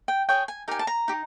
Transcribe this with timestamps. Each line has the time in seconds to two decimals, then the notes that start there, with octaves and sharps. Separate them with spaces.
0.08 G5
0.29 G#4 C#5 G5
0.48 G#5
0.68 D#4 G4 A#4 G#5
0.79 A5
0.87 A#5
1.08 D#4 G4